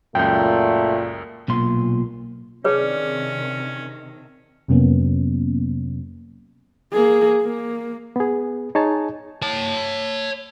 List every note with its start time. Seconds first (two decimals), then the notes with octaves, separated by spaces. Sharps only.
0.15 C#2 F#2 A#2 A3 G5 G6
1.48 B1 A#2 C6
2.64 C3 D#3 C#4 D4 G#4 B4 C#5 E5
4.68 F2 C3 F#3 A#3 B3 C#4
6.92 A#3 G#4
7.42 A#3
8.16 B3 G#4
8.75 D#4 G#4 C#5 G#5 A5
9.42 C#5 A5